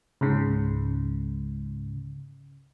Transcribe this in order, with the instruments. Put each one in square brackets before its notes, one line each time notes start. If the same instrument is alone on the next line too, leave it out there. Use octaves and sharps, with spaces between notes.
[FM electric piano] C#2 G#2 C#3